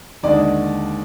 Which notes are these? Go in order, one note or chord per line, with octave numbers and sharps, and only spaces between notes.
D#2 D3 G#3 D4 D5